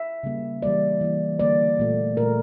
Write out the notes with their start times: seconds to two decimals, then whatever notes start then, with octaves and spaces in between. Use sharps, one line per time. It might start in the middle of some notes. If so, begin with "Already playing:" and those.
Already playing: E5
0.23 C#3 G3 A#3
0.62 E3 G3 A#3 D5
1.01 E3 A#3
1.40 D3 G3 A#3 D5
1.79 A#2 A3
2.17 A#2 A3 A#4